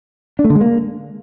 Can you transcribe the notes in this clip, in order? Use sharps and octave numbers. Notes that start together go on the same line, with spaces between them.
D4
A3
D3
G#3
A#3